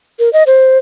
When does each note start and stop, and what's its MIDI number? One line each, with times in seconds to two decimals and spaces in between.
0.19 0.31 70
0.33 0.43 75
0.47 0.78 72